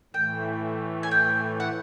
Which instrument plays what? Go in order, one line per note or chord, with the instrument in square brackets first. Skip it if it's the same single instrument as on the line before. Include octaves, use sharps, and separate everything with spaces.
[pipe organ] A2 E3 A3 [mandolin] G5
[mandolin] G#5
G5
F#5